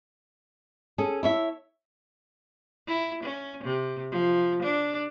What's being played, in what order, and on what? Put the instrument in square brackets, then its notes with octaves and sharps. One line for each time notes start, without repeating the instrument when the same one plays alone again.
[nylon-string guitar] C#4 G#4 A4
E4 C#5 E5
[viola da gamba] E4
C#4
C3
F3
D4